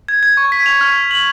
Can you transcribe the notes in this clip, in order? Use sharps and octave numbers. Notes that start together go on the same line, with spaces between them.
G#6
G#6
C#6
B6
F7
F6
F6
F#7